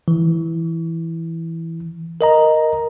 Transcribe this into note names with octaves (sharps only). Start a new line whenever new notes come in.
E3
A#4 D#5 A#5